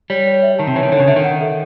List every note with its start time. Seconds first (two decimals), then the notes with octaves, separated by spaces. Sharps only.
0.10 G3 C#5
0.26 C#5
0.43 E5
0.59 D#3 A5
0.67 C3
0.76 E3 C#5
0.83 D#3
0.92 D3 C#5
1.00 C#3
1.08 D3 E5
1.16 D#3
1.24 F#5
1.41 A4